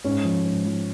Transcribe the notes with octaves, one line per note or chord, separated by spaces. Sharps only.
G#2 C#4
F3
G#2
F3